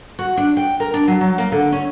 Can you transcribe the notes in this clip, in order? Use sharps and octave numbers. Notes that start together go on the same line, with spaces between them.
F#4
D4
G5
A#4
D4
F#3
F#3
A#3
D3
C#4